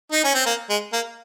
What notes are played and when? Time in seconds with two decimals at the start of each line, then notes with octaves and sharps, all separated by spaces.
0.12 D#4
0.24 C#4
0.35 C4
0.46 A#3
0.70 G#3
0.93 A#3